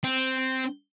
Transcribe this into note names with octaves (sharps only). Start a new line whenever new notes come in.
C4